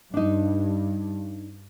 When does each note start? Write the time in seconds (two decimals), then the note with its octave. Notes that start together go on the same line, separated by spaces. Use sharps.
0.14 G2 D4 D#4